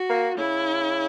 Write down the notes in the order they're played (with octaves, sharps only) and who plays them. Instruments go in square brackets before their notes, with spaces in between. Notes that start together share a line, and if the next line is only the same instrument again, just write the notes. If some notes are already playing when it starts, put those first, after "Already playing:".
Already playing: [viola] F#4
[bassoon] A#3
[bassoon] C#3 [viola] E4